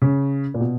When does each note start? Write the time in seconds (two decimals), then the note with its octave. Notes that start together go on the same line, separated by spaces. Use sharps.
0.02 C#3
0.54 A#2
0.60 B2